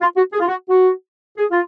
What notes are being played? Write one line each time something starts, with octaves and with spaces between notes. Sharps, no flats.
F4
F#4
G#4
F4
F#4
F#4
G#4
F4